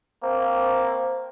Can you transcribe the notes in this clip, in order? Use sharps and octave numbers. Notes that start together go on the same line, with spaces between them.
A#3 C4